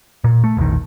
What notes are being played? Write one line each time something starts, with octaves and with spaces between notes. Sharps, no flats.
A#2
A3
E1 A#1 D#3